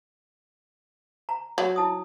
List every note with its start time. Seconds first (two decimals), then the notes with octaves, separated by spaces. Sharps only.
1.29 A#5
1.58 F#3
1.76 E4 A5 D#6